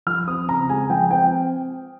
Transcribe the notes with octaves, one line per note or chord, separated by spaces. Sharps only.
F3 F6
C4 D#6
C#3 A#5
G#3 G#5
F3 G5
C4 G5